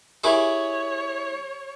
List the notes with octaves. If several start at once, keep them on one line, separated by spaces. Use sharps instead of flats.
E4 G4 G#4 A#4 C#5 G#5 D6